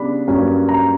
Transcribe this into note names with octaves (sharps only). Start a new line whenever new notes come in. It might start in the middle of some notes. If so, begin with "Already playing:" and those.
Already playing: C#3 G3 B3 D4 B5
G2 F#3 A#3 C#4
A#5